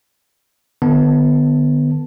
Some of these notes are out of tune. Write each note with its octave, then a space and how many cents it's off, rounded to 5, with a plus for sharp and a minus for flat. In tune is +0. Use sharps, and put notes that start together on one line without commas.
D3 +35 B3 +0 A5 +0